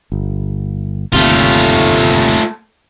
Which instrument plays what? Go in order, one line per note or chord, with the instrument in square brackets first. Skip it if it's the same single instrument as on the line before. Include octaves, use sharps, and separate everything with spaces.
[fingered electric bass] G1
[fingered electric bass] G1 D#2 C3 [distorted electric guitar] A3 F4